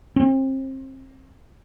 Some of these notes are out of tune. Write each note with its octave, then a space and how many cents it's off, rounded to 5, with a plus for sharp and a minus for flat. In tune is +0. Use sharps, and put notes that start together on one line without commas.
C4 +30